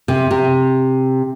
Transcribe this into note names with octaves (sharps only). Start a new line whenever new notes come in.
C3
C3